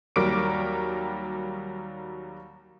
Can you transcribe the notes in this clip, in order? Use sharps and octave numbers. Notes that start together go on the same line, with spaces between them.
D#2 F#3 G3 A#4 D6 D7